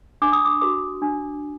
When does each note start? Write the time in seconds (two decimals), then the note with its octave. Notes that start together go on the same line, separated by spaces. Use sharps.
0.22 D4 D6
0.33 D#6
0.45 D6
0.61 F#4 A#4 D6
1.02 D4